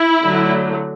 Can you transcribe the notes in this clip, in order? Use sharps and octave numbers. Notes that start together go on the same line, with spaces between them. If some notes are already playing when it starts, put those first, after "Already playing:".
Already playing: E4
D3 F#3 A3